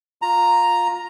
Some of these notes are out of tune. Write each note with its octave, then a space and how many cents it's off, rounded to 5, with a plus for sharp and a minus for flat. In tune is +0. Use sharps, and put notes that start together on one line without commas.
F4 +15 A#5 +0